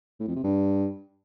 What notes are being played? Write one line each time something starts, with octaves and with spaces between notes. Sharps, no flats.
A2
F2
C3
G2